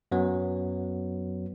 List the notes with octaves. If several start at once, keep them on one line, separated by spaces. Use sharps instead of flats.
F#2 F#3 B3